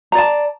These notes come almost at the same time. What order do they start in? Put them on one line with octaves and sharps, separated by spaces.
A#5 D5 A5